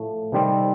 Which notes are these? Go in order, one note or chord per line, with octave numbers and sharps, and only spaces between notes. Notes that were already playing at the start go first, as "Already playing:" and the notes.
Already playing: A2 F3 A3
C3 D#3 G3 C4